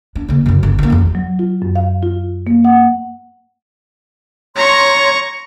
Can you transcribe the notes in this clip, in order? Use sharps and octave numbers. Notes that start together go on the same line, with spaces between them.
D4
C#3 A#3
F#2 C#3
G1
D3 A#3
A1 F2
F#3
F4
F#2
F5
F4
A#3
F#5
C#5 A#5 C6 C#6